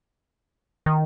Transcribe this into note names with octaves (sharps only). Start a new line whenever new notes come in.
D#3